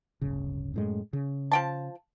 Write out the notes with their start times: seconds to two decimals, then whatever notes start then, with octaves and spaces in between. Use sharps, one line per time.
0.21 D1 G1 C#3
0.74 F#2 A2 G#3
1.13 C#3
1.52 F3 G5 A5